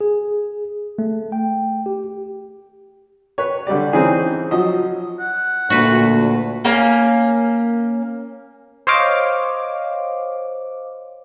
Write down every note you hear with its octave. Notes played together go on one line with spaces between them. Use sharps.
G#4
A3
G5
G4
B4 C#5
D3 G3 G4 D5
E3 C4 C#4 D#4 G#4
F3 F#3 D#5
F#5
D2 A#2 F#4 B4
A#3 C#4
C5 C#5 D#5 F5 D6